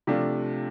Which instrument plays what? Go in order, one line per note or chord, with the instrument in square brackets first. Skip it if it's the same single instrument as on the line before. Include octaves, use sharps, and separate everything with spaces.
[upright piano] C3 F3 A3 D4 F4